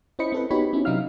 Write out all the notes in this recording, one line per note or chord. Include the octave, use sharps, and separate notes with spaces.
C#4 E4 C5 D#5 B5 C#7
C4 A4 B4
B3 D#4 F#4 G4 C#5 B5
B3 C#4 E4
C3 F#3 D#4 E5 F5 F6